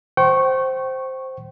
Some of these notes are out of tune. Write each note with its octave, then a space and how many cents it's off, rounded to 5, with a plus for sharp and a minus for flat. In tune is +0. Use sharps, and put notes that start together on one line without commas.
C5 +0 G5 -35 C#6 -15